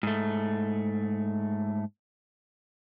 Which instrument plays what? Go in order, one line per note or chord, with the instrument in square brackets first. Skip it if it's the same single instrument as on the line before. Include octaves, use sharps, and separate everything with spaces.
[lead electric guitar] G#2 A3